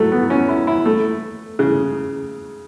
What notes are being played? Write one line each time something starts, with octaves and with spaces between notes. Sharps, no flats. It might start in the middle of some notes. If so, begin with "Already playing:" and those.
Already playing: F#3 A3
B3
C#4
E4
E4
A3
C#3